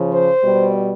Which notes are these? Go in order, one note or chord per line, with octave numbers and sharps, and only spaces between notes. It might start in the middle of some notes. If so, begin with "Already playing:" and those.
Already playing: C#3 F3
C5
B2 G3